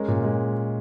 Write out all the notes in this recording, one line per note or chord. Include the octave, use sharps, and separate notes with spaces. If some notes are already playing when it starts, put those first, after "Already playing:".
Already playing: G#3 C#4 A#4
A#2
G#3